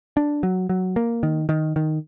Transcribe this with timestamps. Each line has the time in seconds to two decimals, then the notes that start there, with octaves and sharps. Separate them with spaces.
0.17 D4
0.43 F#3
0.69 F#3
0.96 A#3
1.23 D#3
1.49 D#3
1.76 D#3